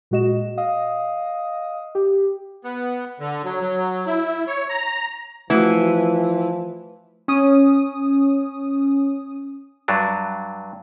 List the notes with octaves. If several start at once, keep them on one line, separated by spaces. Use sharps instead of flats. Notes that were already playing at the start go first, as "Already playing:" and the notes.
A#2 G#3 F#4 D#5 E7
D#5 F5 D#6
G4
B3
D3
F#3
F#3
E4
C#5
A#5
E3 F3 A3 F#4
C#4 D#6
G2 F#3 D4